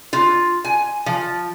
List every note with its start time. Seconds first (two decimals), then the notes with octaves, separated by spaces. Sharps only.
0.13 F4
0.65 G#5
1.06 F3